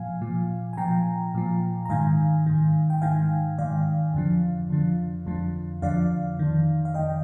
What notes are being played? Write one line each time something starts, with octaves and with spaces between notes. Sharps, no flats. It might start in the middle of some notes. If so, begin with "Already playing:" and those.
Already playing: A#2 F3 F5 G#5
A#2 F3
G#5
A#2 F3 G5 A#5
A#2 F3
A#5
G#2 D#3 F5 G#5
G#2 D#3
G5
G#2 D#3 F5 G#5
G#2 D#3 D5 F5
F2 D3 F3
F2 D3 F3
F2 D3 F3
F2 D3 F3 D5 F5
F2 D#3
F5
F2 D#3 D#5 G5